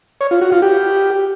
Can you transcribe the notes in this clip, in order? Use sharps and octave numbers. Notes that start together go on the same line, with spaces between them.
C#5
F4
F#4
F4
G4